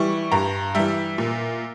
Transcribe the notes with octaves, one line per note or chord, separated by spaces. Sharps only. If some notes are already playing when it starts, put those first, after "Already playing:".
Already playing: E3 G3 C#6
G2 A#5
E3 G3 E5
A#2